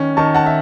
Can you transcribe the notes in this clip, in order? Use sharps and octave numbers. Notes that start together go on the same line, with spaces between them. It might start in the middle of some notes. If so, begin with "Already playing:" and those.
Already playing: D#3 C#4
D#3 A5 C#6
F#5 A5
E5